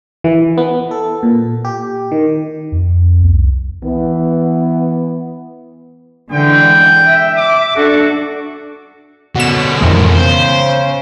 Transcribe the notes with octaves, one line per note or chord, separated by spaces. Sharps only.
E3
B3
A4
A#2
G4
D#3
F2
C2
E3 B3
D3 E3 G#3 G5
E5
D6
D4 F#4 A4
B2 D3 B3 C#4 F#4 E7
F2 A2 D#3 E3 G#3
C#3 B3 C5